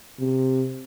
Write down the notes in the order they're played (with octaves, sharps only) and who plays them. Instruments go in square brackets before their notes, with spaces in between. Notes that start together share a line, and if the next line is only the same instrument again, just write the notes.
[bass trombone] C3